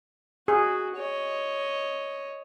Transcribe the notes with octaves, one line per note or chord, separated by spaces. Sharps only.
F#4 G#4
C#5 D#5